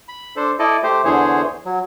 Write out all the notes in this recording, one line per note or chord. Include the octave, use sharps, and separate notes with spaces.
B5
D4 A4 C5
E4 A4 D5 D#5
A3 G4 C5
E2 D3 E3 G#4 C5 C#5
F#3